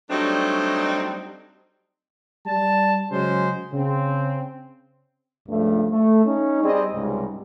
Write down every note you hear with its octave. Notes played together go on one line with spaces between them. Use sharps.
F#3 G3 A3 C4 D4 D#4
G3 D5 A5
C#3 F#3 G#3 C#4 C5
C#3 C4
C#2 G2 F3 A3
A3
C#4 D#4
G3 C4 G#4 D5 D#5
C#2 G#2 C3 G3 G#3